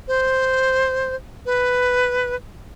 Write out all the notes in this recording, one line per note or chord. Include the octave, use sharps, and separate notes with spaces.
C5
B4